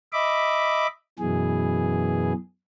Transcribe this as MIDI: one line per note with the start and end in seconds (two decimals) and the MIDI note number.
0.13 0.87 75
0.13 0.87 76
0.13 0.87 83
0.13 0.87 86
1.19 2.33 42
1.19 2.33 47
1.19 2.33 52
1.19 2.33 68